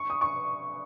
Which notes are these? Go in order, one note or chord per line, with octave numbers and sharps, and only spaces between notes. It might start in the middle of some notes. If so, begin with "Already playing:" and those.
Already playing: C#6
D#6
C#6